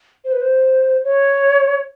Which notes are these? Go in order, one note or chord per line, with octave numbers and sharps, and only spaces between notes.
C5
B4
C5
C#5